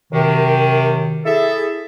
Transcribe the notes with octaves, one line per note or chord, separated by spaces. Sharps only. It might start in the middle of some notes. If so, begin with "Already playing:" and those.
F#2 C3 D#3
E4 G#4 A4 E5